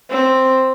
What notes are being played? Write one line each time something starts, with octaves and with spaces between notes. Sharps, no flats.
C4